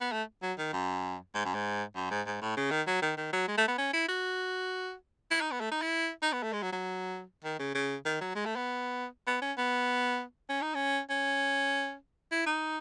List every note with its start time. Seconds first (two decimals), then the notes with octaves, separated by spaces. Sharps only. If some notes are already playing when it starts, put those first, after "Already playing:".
0.01 B3
0.12 A3
0.42 F#3
0.58 D#3
0.73 F#2
1.35 G#2
1.45 F#2
1.54 G#2
1.96 F#2
2.11 G#2
2.26 G#2
2.41 A2
2.57 C#3
2.71 D#3
2.87 F#3
3.02 D#3
3.17 D#3
3.33 F#3
3.48 G#3
3.58 A3
3.68 B3
3.78 C#4
3.93 E4
4.08 F#4
5.31 E4
5.41 D#4
5.51 B3
5.61 A3
5.71 D#4
5.82 E4
6.23 D#4
6.33 B3
6.43 A3
6.53 G#3
6.62 F#3
6.72 F#3
7.44 D#3
7.59 C#3
7.75 C#3
8.05 D#3
8.21 F#3
8.35 G#3
8.45 A3
8.56 B3
9.27 B3
9.42 C#4
9.58 B3
10.49 C#4
10.62 D#4
10.75 C#4
11.10 C#4
12.32 E4
12.47 D#4